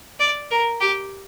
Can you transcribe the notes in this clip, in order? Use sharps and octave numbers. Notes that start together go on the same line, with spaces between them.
D5
A#4
G4